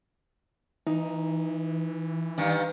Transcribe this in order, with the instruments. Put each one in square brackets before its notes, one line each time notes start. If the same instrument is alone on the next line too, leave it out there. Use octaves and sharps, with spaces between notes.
[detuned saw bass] E3 [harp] D#4
[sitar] G2 D#3